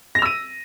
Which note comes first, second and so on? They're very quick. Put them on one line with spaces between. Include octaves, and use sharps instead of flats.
A#6 F7 E6 D#7